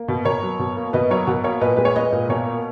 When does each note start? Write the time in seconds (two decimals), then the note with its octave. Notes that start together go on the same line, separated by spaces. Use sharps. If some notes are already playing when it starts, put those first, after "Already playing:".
Already playing: A#3
0.08 B2
0.25 B2 A#4 C#5
0.42 F#3
0.59 B2
0.76 A#3
0.93 B2 B4 D#5
1.10 F#3 A#4 C#5
1.27 B2 F#4 A#4
1.44 A#3 A#4 C#5
1.61 A#2 B4 D#5
1.76 G#3 B4
1.85 C#5
1.95 G#3 B4 D#5
2.12 A#2
2.29 B2 A#4 C#5
2.46 A#3